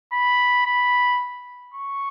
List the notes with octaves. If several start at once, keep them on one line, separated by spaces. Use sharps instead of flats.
B5
B5
C#6